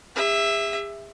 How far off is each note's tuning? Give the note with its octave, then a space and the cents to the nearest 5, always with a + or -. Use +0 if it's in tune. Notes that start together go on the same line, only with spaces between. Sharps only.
G#4 -40 E5 +0